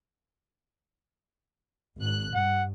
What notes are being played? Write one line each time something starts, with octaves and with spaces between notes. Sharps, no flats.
G#1 F#6
G2 F#5